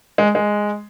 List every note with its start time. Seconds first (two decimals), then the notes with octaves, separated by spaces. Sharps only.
0.18 G#3
0.35 G#3